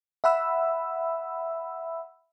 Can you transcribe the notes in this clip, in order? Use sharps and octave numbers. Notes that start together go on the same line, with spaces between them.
E5 F#5 B5 E6